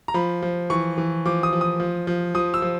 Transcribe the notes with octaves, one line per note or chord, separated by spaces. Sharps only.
A#5
F3 B5
F3
E3 C#6
E3
F3 D6
D#6
F3
D#6
F3
F3
F3 D#6
E6
F3